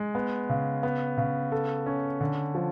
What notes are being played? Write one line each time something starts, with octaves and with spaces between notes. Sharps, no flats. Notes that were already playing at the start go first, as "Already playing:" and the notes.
Already playing: G#3
B3
C#3
B3
C#3
A4
C#4
D3
F3